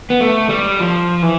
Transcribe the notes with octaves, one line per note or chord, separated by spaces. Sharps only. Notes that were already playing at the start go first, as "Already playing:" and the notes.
B3
A3
G3
F3
E3